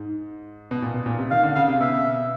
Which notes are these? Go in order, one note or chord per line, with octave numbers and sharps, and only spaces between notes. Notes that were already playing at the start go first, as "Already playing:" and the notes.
Already playing: G#2
B2
A#2
B2
A#2
C3
D#3 F5
D3
C#3 F5
C3
B2 E5